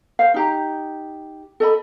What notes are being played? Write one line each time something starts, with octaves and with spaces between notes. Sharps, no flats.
C5 F5
D#4 G4 A#5
A4 D#5 B5